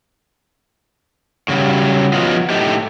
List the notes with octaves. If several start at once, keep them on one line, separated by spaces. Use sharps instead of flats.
A2 C#3 F#3 G3
F3 B3 C#4 D#4 F4 F#4
A2 A3 D#4 G4